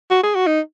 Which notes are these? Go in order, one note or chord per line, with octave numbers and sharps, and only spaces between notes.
F#4
G#4
F#4
D#4